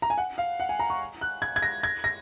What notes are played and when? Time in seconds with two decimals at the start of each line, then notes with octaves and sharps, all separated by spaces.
0.02 A#5
0.10 G#5
0.18 F#5
0.38 F5
0.60 F#5
0.69 G#5
0.79 A#5
0.90 C#6
1.21 F#6
1.42 G#6
1.56 G#6
1.62 A#6
1.83 G#6
2.04 A#6